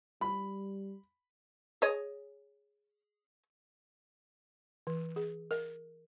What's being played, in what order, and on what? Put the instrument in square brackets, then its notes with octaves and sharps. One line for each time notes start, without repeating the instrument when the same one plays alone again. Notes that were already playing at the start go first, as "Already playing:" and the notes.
[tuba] G3 [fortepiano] B5
[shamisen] G#4 C#5 D#5
[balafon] E3
G#4
A#4